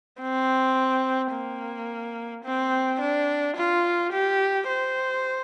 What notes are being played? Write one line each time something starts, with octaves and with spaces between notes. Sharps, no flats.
C4
A#3
C4
D4
F4
G4
C5